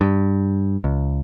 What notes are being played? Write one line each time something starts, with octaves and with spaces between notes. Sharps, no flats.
G2
C#2